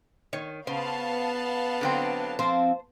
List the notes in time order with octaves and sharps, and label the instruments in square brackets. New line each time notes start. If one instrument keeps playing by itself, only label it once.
[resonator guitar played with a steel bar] D#3 [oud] C#5
[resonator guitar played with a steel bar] C#3 [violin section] B3 F5 A5 [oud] C5
[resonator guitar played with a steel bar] D3 F#3 C4
[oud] F3 C4 [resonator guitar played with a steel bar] C5 A5